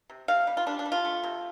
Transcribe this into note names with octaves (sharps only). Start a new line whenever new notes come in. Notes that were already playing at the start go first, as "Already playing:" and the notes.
C3
C3 F5
G3
F4
G3 D4
D4
G3
F4
A3
C3